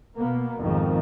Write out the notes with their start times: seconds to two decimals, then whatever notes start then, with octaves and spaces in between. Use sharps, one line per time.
0.17 B2 A#3 B3
0.59 G#1 F2 G#2 D#3 F3